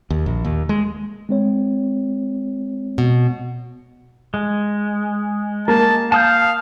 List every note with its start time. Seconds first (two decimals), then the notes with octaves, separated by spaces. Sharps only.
0.10 D#2
0.26 A#1
0.45 D#2
0.69 G#3
1.29 G#3 C4 C#5
2.98 B2
4.34 G#3
5.68 A#3 A5
6.12 F5 A5 D#6 G6